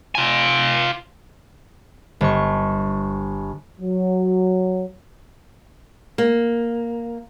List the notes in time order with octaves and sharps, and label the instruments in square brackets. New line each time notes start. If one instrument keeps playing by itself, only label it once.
[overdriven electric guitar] F4 G#5
[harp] G1 C#6
[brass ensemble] F#3
[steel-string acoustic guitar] A#3